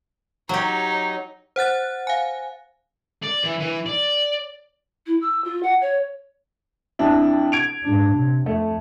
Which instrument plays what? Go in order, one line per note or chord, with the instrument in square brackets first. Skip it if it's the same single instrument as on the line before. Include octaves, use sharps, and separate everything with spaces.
[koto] F#3 G4 [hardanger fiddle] D#4 C#5
[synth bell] C5 F#5 F#6 A6
F5 G#5
[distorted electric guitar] D5
E3
E3
D5
[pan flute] E4
E6
F4
F#5
C#5
[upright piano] F2 D4 E4
G#6 D7 F7
[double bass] G#2 D4
C3
[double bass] F2 [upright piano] A3